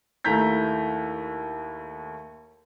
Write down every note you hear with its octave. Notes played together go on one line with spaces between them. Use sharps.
D#2 A3 E4 A#5 G6 B6